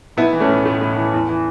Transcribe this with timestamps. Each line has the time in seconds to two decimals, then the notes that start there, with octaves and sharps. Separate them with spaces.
0.17 B1 B3 E4
0.33 E3
0.40 A3 C#4
0.48 A2
0.65 A2 A3
0.81 A2
0.96 E3
1.13 E2
1.29 E3